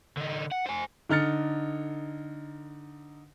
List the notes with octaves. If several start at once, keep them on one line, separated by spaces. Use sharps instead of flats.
D3 D#4
F#5
C5 G#5
D3 D#4 F6 A6 C#7